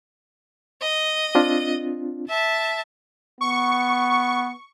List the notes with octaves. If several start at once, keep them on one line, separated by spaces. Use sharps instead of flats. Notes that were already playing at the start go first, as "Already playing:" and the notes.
D#5
C4 D4 F4
E5 A5
B3 C#6